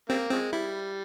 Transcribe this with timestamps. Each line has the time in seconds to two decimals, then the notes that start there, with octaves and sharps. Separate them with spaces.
0.09 C#3 G3 A#3 C4
0.31 C#3 F3 G#3 C4
0.53 G3 E4